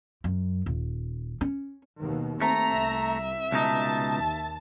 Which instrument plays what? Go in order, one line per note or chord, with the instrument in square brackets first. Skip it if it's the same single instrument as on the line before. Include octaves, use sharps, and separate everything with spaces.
[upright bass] F#2
D#1
C#4
[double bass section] D#2 B2
[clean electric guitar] A3 [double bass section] C4 [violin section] A#5
[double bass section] C2 [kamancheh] E5
[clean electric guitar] C#2 B2 D#4 [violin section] A5
[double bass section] D#2